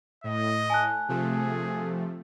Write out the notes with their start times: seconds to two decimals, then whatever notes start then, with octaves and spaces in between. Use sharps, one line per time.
0.24 A2 D#5
0.70 G#5 A5 F#6
1.09 C3 F3 A3 G#4